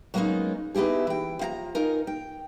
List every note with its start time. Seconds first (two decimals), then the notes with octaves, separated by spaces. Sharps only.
0.14 F#3 G#3 A#3 B3 C#4 D#4
0.74 B3 D#4 E4 G4 G#4
1.07 E3 G5
1.39 F3 F5 A#5
1.75 D#4 F4 A#4 G#5
2.07 G5